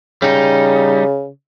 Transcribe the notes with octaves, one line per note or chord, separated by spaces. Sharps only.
C#3 G3 D#4